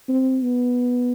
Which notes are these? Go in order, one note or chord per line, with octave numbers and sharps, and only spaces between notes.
C4
B3